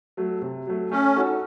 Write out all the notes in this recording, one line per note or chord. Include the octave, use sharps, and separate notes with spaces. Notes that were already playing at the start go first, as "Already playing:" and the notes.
F#3 A3
C3
F#3 A3
A3 C#4
D#4 F#4 A4